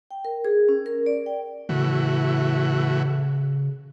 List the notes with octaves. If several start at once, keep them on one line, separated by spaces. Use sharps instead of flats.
G5
A#4
G#4
C#4
A#4
D5
G5
A2 C#3 E3 F#4